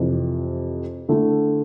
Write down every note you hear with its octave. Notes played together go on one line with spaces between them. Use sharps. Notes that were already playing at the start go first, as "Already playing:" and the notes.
Already playing: F2 C3 E3
D3 A3 E4